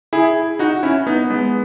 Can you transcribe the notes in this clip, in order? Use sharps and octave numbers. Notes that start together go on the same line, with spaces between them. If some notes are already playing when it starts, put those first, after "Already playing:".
E4 G#4
D#4 F#4
C#4 E4
B3 D#4
G#3 B3